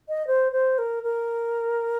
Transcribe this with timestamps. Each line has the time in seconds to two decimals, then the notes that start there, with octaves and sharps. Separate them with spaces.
0.09 D#5
0.27 C5
0.52 C5
0.78 A#4
1.03 A#4